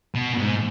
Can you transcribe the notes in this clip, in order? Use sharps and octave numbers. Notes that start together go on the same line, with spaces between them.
B2
G#2